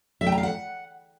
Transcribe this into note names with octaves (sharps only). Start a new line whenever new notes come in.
E5
G5
A#5
F5
F#5